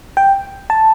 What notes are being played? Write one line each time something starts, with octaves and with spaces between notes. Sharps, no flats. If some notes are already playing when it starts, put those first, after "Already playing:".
G5
A5